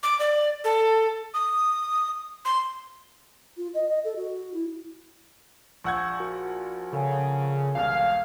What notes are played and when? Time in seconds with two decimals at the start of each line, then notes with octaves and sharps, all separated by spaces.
0.03 D6
0.19 D5
0.64 A4
1.34 D#6
2.45 C6
3.57 F4
3.74 D#5
3.88 D#5
4.04 A4
4.16 F#4
4.54 E4
5.84 A#1 F#5 C#6 E6 G6 G#6
6.20 F#4 A#4
6.93 C#3 A4 A#4 G#5
7.75 E1 C2 F5